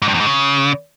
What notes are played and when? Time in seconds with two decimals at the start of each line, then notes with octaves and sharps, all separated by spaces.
0.02 G#2
0.08 G2
0.14 E2
0.20 G#2
0.26 C#3